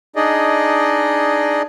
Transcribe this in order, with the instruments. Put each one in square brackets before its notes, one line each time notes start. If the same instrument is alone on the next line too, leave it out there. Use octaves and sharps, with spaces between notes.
[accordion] D4 D#4 G#4 D5 D#5